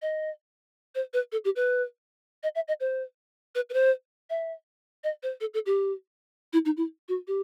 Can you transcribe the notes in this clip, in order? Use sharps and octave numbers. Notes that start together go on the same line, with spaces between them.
D#5
C5
B4
A4
G4
B4
D#5
E5
D#5
C5
B4
B4
C5
E5
D#5
C5
A4
A4
G4
E4
D#4
E4
F#4
G4